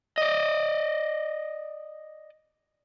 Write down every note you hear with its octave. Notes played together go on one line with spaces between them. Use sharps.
D5 D#5